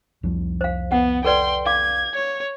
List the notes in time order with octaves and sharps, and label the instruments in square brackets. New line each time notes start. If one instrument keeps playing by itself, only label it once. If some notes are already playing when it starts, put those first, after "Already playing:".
[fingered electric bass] C2 F2 F3
[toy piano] C5 F5
[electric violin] B3 [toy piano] F#5
[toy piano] A4 B4 D5 [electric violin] G5 C6
[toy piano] F5 D6 [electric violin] G#6
[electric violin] C#5